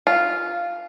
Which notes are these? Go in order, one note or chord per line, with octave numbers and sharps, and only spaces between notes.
F4